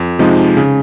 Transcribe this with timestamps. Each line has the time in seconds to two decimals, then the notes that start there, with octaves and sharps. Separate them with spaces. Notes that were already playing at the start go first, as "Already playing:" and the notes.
Already playing: F2
0.19 C3 F3 G#3 D#4
0.57 C#3